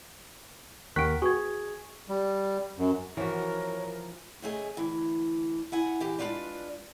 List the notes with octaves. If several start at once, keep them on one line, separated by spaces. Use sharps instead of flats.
D#2 A#4 F#5 G5 C#6 F#6 B6 D7
F#4 G#4 B4 C#6 G#6
G3
F#2
E3 F3 F#4 A#4 C#5
C#3 A3 G#4 D#5
D2 E3
E4 F#5 G#5
E3 G4
G#3 D4 D#4 F4 B4 D5